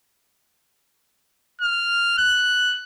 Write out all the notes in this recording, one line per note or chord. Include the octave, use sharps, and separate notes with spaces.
F6
F#6